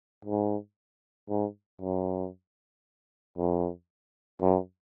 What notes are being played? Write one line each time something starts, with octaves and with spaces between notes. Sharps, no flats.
G#2
G#2
F#2
F2
F#2